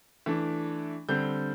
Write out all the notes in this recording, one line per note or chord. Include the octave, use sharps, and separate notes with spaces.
E3 A3 D4
D3 G3 C4 G6